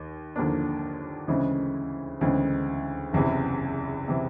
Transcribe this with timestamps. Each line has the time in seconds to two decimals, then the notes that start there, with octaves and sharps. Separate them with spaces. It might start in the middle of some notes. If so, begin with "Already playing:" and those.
Already playing: D#2
0.36 D#2 D3 F3 A#3 D4
1.28 D2 C#3 E3 G#3 C4
2.21 D2 C#3 E3 G#3 C4
3.13 F#1 E2 C3 E3
4.08 C3 E3